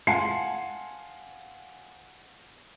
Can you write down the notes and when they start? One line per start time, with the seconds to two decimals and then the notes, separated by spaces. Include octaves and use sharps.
0.07 F5 F#5 G#5 A5 C6 C7